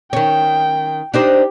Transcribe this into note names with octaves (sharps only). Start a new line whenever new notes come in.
D#3 C#4 G5
D4 D#4 G4 C5